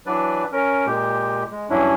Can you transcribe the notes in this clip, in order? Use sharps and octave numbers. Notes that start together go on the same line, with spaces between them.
E3 F#3 D4 B4 D5
C#4 A#4
A#2 G#3 G4
G#3
G2 E3 F#3 C#4 D4 E4